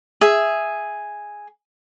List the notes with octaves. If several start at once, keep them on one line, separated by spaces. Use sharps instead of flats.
G#4 E5